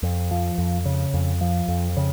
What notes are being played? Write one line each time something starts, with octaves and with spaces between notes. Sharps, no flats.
F2
F3
F2
C#3
F2
F3
F2
C#3